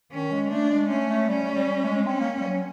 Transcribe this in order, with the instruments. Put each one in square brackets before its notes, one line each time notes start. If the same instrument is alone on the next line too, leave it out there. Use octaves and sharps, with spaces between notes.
[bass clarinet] D#3 [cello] C#4
[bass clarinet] G#3
[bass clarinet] A3 [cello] D4
[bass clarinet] G#3
[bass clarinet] A3 [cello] C#4
[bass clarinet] A3
[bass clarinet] G3 [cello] C#4
[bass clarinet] G3
G3
G3
A3
G#3
[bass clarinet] C4 [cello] C#4
[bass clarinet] A#3
G3
F#3